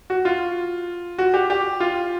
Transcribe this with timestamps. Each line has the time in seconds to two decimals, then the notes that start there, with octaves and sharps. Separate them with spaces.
0.10 F#4
0.25 F4
1.18 F#4
1.34 G4
1.50 G4
1.80 F4